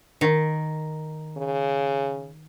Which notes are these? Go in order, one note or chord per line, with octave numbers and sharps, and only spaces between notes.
D#3
C#3